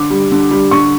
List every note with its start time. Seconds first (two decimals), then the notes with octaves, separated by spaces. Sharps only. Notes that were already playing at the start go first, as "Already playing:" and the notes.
Already playing: D3 D6
0.10 G3
0.32 D3
0.51 G3
0.71 D3 C#6